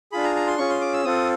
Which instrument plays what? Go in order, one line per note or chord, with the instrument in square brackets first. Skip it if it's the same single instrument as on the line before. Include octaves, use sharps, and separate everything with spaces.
[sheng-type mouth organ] D4 F4 G#4 B5
A#5
A#5
C6
C#4 F4 G#4 C#6
C6
D6
E6
C4 F4 A4 D#6